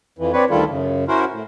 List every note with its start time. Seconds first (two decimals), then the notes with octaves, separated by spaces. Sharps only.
0.19 F2 E3
0.33 C4 D4 B4 C#5
0.50 D2 D#3 G3 E4 F4 A4
0.69 F#2 C#3
1.08 C#4 E4 F#4 A#4 C5
1.31 A2